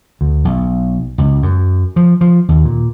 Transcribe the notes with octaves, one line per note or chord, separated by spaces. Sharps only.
D2
B1
C#2
F#2
F3
F3
D#2
A#2